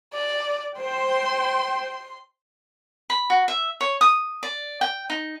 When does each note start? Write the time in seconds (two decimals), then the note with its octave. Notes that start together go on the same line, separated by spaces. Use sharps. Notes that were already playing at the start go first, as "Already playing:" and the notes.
0.14 D5
0.80 C5 G5 C6
3.10 B5
3.30 F#4
3.48 E5
3.81 C#5
4.01 D#6
4.43 D5
4.81 G5
5.10 D#4